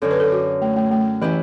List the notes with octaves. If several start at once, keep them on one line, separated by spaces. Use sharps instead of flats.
F#2 D3 F#3 A4
B4
A4
F#4
A3
A3
A3
E3 F#3 C#4 E4 G4 B4